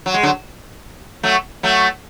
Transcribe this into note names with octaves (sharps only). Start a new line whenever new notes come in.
F#3
G#3
D3 F#3
F#3 A3
F#3 A3